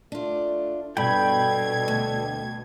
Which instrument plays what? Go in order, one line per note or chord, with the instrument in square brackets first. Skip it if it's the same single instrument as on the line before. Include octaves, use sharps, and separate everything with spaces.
[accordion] A3 [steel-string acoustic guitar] D4 F4
[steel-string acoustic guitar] G2 [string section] B2 G#6 [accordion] D4 A4 [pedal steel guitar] G5 B5
[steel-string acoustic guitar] D2